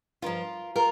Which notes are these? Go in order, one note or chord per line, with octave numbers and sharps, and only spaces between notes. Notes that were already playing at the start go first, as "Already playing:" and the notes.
G2 F3 F4 A#4
F4 A#4